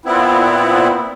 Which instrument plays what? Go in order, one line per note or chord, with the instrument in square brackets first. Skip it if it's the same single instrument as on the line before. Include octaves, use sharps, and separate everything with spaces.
[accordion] A#2 B3 C4 E4